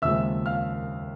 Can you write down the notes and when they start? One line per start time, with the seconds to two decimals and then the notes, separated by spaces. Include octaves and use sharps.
0.02 D#2 C#3 F3 G#3 E5 E6
0.46 F5 F6